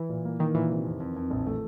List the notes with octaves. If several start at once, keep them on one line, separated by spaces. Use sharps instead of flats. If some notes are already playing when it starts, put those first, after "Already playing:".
Already playing: E3
A#2
A#3
D#3 A#3
A#2 E3
C3
F2
F2
F2
A#1
A3